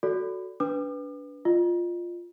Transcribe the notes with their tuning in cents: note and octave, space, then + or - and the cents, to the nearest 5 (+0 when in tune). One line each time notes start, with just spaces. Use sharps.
F#4 +0 A4 +0 D5 -35
D4 -30 B4 +0 D6 +40
F4 +0 D#5 -35